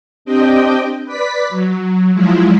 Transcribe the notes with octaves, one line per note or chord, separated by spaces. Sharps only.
C4 D4 G4 D#5 G5
B4 D5 B6
F#3
F3 F#3 G#3 E4 F4